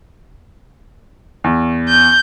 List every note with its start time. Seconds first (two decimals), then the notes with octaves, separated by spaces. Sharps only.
1.44 E2
1.89 G6